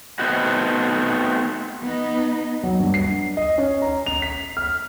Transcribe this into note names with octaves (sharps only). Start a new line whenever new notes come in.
A3 B3 C4 D#4 F#4
B3 D#4
F#3
G2
C7
D#5
C#4
A#5
F7
B6
F6